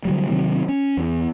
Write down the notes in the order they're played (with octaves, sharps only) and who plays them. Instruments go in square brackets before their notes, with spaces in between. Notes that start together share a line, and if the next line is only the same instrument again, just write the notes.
[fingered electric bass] D3 F#3 G3
C3 D#3 F#3 C4
C#4
E2